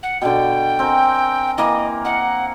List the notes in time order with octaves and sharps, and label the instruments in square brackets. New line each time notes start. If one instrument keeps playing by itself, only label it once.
[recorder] F#5
[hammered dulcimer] B2 D3 [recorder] G5
[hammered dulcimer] C4 A#4 G#5
[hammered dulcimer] E3 A#3 [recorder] D#5
[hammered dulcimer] D#5 [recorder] F#5